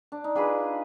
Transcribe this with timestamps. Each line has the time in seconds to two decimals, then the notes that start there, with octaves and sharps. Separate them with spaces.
0.12 D4
0.24 D#4
0.35 D4 F4 G#4 B4